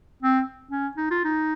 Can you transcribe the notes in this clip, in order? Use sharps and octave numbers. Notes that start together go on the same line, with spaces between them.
C4
C#4
D#4
F4
D#4